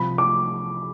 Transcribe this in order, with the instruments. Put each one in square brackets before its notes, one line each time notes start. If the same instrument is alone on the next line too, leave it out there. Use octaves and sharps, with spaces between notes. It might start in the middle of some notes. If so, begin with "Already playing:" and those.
Already playing: [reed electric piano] C2 C3 F3 [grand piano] B5
[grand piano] D6